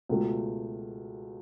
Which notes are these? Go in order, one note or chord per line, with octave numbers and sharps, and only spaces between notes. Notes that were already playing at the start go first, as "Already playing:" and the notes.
C#2 B2 A3